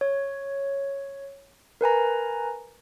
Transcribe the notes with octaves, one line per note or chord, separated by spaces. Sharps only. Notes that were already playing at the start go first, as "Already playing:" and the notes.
C#5
A#4 B4 G#5 A#5